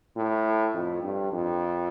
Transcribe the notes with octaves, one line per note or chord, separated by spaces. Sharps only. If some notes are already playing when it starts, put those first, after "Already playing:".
A2
F2
G2
F2